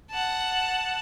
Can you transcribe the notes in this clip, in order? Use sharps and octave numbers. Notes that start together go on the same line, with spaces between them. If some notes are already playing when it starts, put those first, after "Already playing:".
F#5 A5